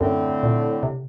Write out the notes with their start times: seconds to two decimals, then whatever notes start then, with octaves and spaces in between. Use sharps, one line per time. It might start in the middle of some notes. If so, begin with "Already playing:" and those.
0.01 F#2 A2 D3 C4
0.43 A#2
0.83 C3